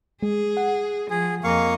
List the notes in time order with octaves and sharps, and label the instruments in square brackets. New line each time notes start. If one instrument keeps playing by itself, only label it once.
[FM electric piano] G#3 [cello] G#4
[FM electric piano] F#5
[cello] F3 [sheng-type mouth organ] G#4
[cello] F2 D#5 [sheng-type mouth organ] A#3 F5 C#6